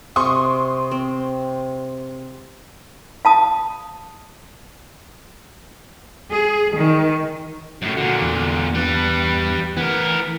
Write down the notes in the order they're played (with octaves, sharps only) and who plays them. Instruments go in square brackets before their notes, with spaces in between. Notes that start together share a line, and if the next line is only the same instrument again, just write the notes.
[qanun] C3 [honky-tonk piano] C6 C#6 D#6
[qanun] C4
[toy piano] F5 A5 D#6
[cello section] G#4
D#3
[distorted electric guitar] F#2 A2
[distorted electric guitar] A#2 D3 [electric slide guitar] F#4
[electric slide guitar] E2
[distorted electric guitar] G3 B4
[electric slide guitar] E3 [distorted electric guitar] B3 A#4